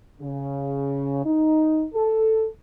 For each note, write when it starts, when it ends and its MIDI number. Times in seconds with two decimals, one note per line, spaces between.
0.21 1.24 49
1.25 1.85 63
1.95 2.47 69